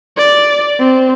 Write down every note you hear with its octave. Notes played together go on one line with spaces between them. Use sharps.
D5
C4